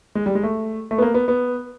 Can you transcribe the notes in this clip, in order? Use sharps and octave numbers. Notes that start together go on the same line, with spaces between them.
G#3
G3
G#3
A3
A3
B3
A#3
B3
B3